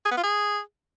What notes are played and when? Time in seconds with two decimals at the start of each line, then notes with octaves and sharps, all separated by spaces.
0.05 G#4
0.11 B3
0.17 F4
0.23 G#4